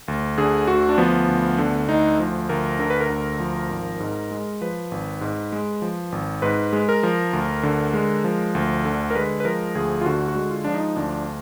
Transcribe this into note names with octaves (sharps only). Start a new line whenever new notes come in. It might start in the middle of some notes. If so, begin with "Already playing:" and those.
D2
D3 G#4
D2 F#4
D4
F3 B3
D2
D3
D2 D#4
F3
D2 A#4
D3 A#4
B4
A#4
D2
F3
G#1
G#2
G#3
F3 B4
G#1
G#2
G#3
F3
G#1
G#2 B4
G#3
A#4
F3
D2
D3
G#3
F3
D2
D3
A#4
G#3 B4
B4
F3 A#4
D2 G#4
F4
D3 F#4
F#4
G#3
F4
F3 D4
D#4
D2 D4